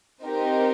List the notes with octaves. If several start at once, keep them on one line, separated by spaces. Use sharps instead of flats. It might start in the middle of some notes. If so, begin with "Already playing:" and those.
C4 D#4 G4 A#4